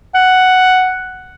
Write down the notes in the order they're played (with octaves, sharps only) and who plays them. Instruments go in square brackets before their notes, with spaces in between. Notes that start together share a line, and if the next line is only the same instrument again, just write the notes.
[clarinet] F#5